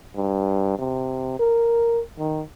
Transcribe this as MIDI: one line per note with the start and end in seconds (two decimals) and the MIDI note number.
0.16 0.77 43
0.79 1.36 48
1.40 2.01 70
2.19 2.42 51